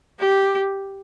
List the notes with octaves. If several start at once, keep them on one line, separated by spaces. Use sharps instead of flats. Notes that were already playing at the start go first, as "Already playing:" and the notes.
G4